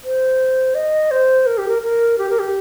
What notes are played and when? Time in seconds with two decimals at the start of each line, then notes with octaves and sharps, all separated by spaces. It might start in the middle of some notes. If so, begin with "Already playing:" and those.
0.04 C5
0.75 D#5
1.11 C5
1.46 A#4
1.58 G4
1.68 A#4
1.82 A#4
2.18 G4
2.29 A#4
2.40 G4